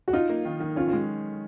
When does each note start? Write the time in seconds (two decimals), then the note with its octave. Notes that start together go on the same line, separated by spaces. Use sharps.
0.08 F#4
0.13 D#4 F4
0.29 A#3
0.45 D#3
0.60 D#3
0.76 C#4 F4
0.88 F4
0.93 G#3